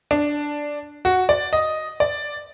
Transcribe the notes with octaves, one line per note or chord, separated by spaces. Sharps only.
D4
F#4
D5
D#5
D5